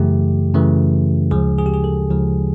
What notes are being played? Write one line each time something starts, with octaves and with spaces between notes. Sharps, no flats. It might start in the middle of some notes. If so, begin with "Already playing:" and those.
Already playing: F#2 C#3 E3 A3 G4
F#2 C#3 E3 A3
D2 C#3 F3 G#3 G#4
G#4
G4
G#4
A4
D2 C#3 F3 G#3